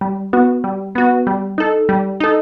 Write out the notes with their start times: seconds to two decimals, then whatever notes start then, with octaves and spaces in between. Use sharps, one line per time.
0.01 G3
0.33 B3 F#4
0.64 G3
0.95 B3 F#4
1.27 G3
1.58 D#4 A4
1.89 G3
2.20 D#4 A4